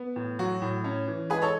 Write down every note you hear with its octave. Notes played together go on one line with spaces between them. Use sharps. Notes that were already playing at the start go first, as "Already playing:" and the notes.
Already playing: B3
A2
F#3 F#4
A2
C#4
E3
G#3 G#4 B4
A4 C#5